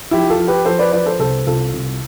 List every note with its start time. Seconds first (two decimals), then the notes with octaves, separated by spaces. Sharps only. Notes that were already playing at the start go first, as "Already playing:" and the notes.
0.11 F3 E4 G4
0.30 F4 A4
0.39 F3
0.47 G4 B4
0.65 F3 A4 C5
0.79 B4 D5
0.92 F3 B4 D5
1.06 A4 C5
1.19 C2 A4 C5
1.47 C2 F4 A4
1.74 C2